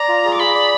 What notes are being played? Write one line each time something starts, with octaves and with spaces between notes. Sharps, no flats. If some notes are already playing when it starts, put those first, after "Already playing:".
Already playing: D5 A#5
F4
G#4
D6
G#4 B5
D5